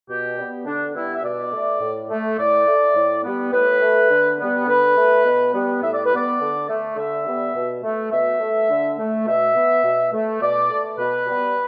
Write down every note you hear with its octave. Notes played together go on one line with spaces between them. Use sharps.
B2 G4
G3 B3
D3 D4
G3 B3 E4
E5
B2 D5
A3
A2
A3
A2 D5
A3
A2
G3 B3
A2 B4
A3
D3
G3 B3
D3 B4
A3
B2
G3 B3
A2 E5
D5
B4
G3 B3 D5
D3
A3
D3 E5
G3 B3
B2
A3
B2 E5
A3
D3
A3
B2 E5
B3
B2
A3
B2 D5
A3
B2 B4
G3 B3